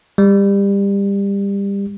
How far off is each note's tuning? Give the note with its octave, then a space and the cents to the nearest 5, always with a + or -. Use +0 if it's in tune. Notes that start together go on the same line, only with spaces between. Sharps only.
G3 +25